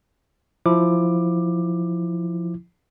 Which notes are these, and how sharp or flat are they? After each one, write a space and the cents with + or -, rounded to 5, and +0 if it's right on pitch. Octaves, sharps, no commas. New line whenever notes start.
F3 +0 E4 +0 D6 +15